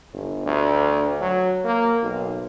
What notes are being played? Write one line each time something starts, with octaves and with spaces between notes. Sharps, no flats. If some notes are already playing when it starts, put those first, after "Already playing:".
G1
D2
F#3
A#3
B1